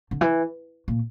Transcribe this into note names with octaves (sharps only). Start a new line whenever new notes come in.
D3
E3
A#2